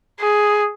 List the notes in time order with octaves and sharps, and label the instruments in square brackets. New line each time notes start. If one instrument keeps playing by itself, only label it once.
[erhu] G#4